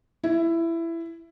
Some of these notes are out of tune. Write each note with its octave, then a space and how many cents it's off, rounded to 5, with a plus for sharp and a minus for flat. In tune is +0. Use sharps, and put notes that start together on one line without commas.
E4 +15